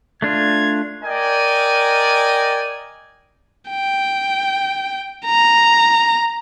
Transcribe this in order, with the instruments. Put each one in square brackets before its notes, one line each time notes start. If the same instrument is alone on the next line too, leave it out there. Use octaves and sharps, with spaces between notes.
[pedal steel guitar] A3 D4 F4 [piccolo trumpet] G#6
[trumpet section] A#4 D5 D#5 G5 G#5
[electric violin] G5
A#5